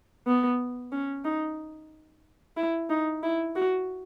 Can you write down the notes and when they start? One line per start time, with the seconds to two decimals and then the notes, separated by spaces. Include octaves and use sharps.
0.27 B3
0.92 C#4
1.25 D#4
2.57 E4
2.90 D#4
3.23 E4
3.56 F#4